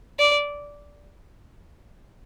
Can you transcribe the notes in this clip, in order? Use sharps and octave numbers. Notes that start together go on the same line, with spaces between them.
D5